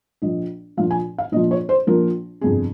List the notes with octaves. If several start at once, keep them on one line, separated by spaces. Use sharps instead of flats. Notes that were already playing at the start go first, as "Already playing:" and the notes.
A#1 A#2 F3 D#5
A#1 A#2 F3 F5
G#5
F5
A#1 A#2 F3 D#5
C#5
C5
A#1 A#2 F3 A#4
G1 F2 C3 G#4